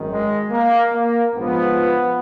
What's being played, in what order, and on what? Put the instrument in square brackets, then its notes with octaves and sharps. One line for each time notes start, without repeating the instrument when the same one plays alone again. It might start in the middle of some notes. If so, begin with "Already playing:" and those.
Already playing: [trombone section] G#1 F#2 D#3
G#3
A#3
A#3
A#1 G#2 F3 B3